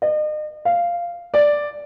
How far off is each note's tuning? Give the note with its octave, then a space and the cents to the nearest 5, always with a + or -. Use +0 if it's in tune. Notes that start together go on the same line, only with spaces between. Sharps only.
D#5 -40
F5 -10
D5 +0